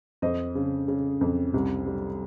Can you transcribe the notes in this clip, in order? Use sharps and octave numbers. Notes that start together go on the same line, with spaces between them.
F2 C5 D#5
C#3
C#3
F2
C2
G3